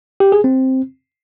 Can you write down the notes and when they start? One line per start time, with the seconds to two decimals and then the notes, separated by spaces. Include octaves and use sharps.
0.20 G4
0.32 G#4
0.44 C4